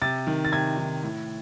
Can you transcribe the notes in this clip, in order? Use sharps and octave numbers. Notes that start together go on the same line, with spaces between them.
C3 A6
D#3
A6
C3 G#6
D#3
A2